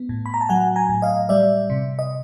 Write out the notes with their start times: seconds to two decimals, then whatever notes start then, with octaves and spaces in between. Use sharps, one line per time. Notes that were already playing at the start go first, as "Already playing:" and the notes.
Already playing: B3
0.09 A2
0.26 B5
0.34 A#5
0.41 A5
0.49 F#3 F#5 G#5
0.76 G#5 A#5
0.89 A2
1.02 D#5 F5
1.29 G3 D5 E5
1.70 C3
1.99 D#5